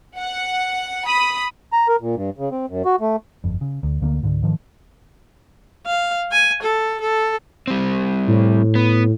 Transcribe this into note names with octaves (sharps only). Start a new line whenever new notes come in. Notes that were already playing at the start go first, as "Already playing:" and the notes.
F#5
B5 D#6
A#5
A#4
A#2
G2
C#3
C4
F#2
F#4
A3
G1 F2
C#3
D2
D2 D3 A3 A#3
C#2 G#2 D3
G#2 D#3 F3
F5
G#5
A4
A4
G3 C4
A2
B3